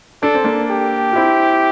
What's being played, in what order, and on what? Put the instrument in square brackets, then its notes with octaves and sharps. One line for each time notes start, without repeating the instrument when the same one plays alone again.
[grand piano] D4 [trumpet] A4
[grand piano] C4
A#3 D4
[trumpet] G4
[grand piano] F4
C4 E4